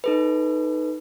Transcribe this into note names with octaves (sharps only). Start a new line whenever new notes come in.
D#4 A4 B4